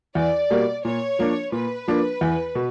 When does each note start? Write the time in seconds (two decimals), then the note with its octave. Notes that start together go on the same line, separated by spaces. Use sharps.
0.15 E2 D5
0.50 B2 G3 A#3
0.85 A#2 C#5
1.19 F3 A#3 D4
1.52 A#2 B4
1.88 F3 A#3 D4
2.21 E2
2.55 B2